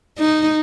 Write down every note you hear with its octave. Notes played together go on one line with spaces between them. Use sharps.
D#4